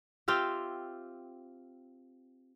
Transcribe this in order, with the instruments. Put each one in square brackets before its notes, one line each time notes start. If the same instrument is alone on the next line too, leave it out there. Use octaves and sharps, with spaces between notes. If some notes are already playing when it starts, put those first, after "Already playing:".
[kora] C4 F4 G4 E5